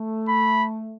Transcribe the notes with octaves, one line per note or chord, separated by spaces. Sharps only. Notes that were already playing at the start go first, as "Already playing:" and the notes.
Already playing: A3
B5